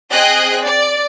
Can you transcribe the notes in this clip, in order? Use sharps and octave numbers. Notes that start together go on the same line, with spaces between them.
C4 G#4 D#5 G5 F#6
D5